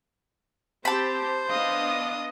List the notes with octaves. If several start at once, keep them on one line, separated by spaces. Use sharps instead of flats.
C4 G4 C5 A5 B5
B3 D4 D#5 F5 D#6